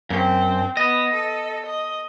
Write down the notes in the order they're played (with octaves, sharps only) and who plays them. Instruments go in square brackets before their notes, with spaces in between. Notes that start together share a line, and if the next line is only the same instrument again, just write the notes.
[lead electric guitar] F#2 [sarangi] C4
[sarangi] B3 [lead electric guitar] D#5
[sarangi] A4
D#5